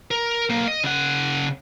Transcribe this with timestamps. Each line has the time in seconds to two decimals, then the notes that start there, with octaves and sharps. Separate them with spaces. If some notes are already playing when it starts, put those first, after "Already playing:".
0.11 A#4
0.50 B1 A#3
0.68 D#5
0.84 C#3 F#5